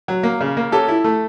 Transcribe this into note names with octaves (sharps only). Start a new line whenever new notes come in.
F#3
A#3
C#3
A#3
C#4 G4 A4
E4
A3